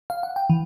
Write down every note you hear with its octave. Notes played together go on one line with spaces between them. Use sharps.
F5
F#5
G5
E3